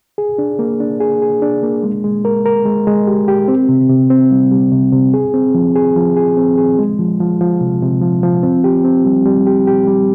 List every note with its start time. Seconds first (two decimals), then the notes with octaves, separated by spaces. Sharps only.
0.18 G#4
0.38 D4
0.59 A#3
0.80 D4
1.00 G#4
1.22 G#4
1.42 D4
1.63 A#3
1.83 G#3
2.04 G#3
2.25 A#4
2.45 A#4
2.65 G#3
2.87 G#3
3.07 G4
3.28 G4
3.48 C4
3.69 C3
3.89 C3
4.10 C4
4.31 G3
4.51 G3
4.72 C3
4.93 C3
5.14 G#4
5.34 C4
5.54 F3
5.75 G#4
5.96 F3
6.17 G#4
6.37 C4
6.58 G#4
6.79 G#3
6.99 F3
7.20 F3
7.41 F3
7.61 C3
7.82 C3
8.02 F3
8.23 F3
8.43 C4
8.64 G4
8.84 C4
9.05 G3
9.26 G3
9.47 G4
9.67 G4
9.87 G3